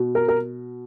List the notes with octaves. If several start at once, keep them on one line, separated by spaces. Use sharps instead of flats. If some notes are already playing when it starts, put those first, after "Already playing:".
Already playing: B2
A#4
A#4